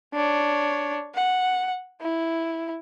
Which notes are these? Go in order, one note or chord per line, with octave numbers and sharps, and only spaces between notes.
D4 C#5
F#5
E4